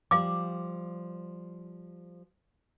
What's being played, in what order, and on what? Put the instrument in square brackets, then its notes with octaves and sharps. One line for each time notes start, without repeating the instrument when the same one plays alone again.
[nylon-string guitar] F3 G3 [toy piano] F5 D6